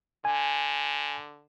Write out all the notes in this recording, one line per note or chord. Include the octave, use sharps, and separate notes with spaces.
D3 G#5